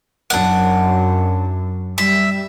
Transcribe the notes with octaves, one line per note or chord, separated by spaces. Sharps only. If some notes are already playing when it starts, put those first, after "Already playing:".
F#2 D4 F#5
G3 E5